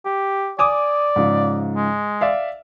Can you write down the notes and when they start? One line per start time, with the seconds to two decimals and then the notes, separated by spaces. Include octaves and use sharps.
0.06 G4
0.59 D5 G#5 D6 D#6
1.16 G#2 C#3 F3
1.76 G#3
2.21 D5 E5 F5